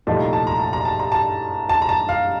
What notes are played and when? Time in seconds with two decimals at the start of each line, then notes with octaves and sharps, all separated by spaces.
0.07 C2 A#2 F3 A3 D#4 A5
0.20 A#5
0.33 A5
0.47 A#5
0.60 A5
0.73 A#5
0.85 A5
0.99 A#5
1.12 A5
1.69 A5
1.82 A#5
1.89 A5
2.09 F5